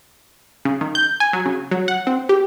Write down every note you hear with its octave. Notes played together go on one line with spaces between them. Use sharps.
C#3
D#3
G6
G#5
F#3
C#3
F#3
F#5
C4
G4